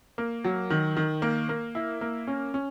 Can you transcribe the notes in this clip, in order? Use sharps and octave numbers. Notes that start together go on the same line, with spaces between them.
A#3
F#3
D#3
D#3
A#3
A#3
E4
A#3
C#4
C#4